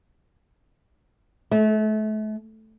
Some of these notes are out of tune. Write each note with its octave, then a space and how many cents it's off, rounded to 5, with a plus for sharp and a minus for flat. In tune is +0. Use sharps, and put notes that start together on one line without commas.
A3 -35